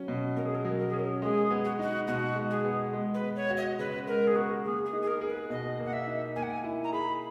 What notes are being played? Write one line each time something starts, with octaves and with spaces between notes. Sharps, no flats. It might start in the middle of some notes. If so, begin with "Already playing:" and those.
Already playing: F#3 C#4
B2
B2 A#4
G#4
A#4
F#3
A#4
C#4 G#4
A#4
G#3 G#4
B3
F#4
D#4 F#4
B2 F#4
G#3
G#4
B3
G#3
B4
B3
C#5
F#4
D#5
C#3 B4
G#3 A#4
G#4
B3 F#4
A#3 G#4
G#4
D#4
G#4
A#4
G#4
B4
B2 D#5
A#3
F#5
E5
D#4
A#3 G#5
F#5
G#5
E4
A#5
G#4 B5